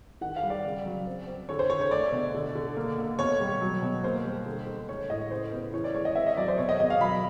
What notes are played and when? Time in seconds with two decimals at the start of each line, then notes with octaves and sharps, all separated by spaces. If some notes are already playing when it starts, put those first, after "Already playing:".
0.21 D#3 F#5
0.36 F5
0.43 G3
0.50 D5
0.64 C#3
0.86 F#3
1.07 C4
1.27 C4
1.49 D3 C#5
1.59 C5
1.70 D3 C#5
1.81 C#5
1.91 A3 D5
2.12 B2
2.35 D3
2.55 D3
2.77 A#3
2.98 A#3
3.19 B2 C#5
3.40 G3
3.61 F#3
3.82 B2
4.03 A#3 C5
4.24 G3
4.46 D3
4.67 D3
4.88 G#3 C#5
5.10 A2 D#5
5.31 C#3 C5
5.52 B3
5.73 E3 C#5
5.84 D5
5.94 G#3 C#5
6.05 D#5
6.15 C4 E5
6.27 D#5
6.37 F#3 D5
6.48 C5
6.58 B2 C#5
6.69 D#5
6.79 B2 D#5
6.90 F5
7.01 F#3 B5